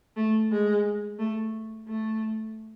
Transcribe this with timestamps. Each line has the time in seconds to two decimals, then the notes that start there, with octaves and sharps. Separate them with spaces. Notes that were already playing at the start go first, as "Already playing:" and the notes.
0.17 A3
0.52 G#3
1.19 A3
1.88 A3